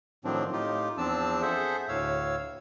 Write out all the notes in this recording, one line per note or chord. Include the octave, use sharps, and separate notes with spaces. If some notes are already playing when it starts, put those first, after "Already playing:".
A2 D#3 F3 F#3 C4 D4
A2 D#4 F4 G4
E2 F3 C4 D4 A5 E6
G#4 A4 C5 E5 F#5
D2 A2 C#5 F5 E6